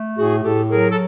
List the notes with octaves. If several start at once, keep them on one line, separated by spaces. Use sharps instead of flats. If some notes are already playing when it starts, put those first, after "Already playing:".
Already playing: A3
A2 F#4 G#4
A2 G4 A4
F#3 G#4 A#4
A4